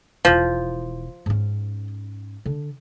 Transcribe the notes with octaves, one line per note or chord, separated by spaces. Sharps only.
E1 F3 E4
G#2 C#4
D3